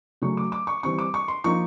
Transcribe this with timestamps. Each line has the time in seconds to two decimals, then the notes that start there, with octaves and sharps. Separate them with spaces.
0.22 C#3 F#3 A3 C#6
0.37 D6
0.52 D6
0.67 C#6
0.83 E3 G3 C4 C#6
0.99 D6
1.14 C#6
1.28 C6
1.44 F3 A#3 D#4 C#6